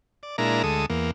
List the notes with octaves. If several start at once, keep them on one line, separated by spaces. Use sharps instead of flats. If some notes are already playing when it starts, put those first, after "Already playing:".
D5
A#2 G#3 D4 E4 A#4 A#5
D2 G#3 A4 D#6
E2 A#3